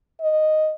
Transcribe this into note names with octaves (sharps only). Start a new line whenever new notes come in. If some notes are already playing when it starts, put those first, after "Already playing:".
D#5